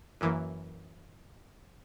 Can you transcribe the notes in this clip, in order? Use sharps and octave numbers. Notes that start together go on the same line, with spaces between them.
F#2 E3 A#3